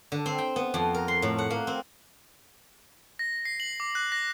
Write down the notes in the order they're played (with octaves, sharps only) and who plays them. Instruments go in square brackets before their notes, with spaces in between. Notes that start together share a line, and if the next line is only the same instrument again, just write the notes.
[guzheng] D3
C4
G5
B3
F2
A#4
C6
A2
F#5
A#3
C4
[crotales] A#6
C7
F#7
D6
F#6
A#6